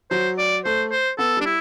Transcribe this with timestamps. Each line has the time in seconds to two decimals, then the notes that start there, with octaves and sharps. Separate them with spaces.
0.11 F#3 C5
0.38 D5
0.64 A3 C5
0.91 C5
1.18 B3 A4
1.37 G3 D4
1.45 E4